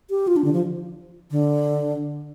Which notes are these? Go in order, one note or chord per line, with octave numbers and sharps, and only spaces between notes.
G4
F4
D4
D3
F3
D3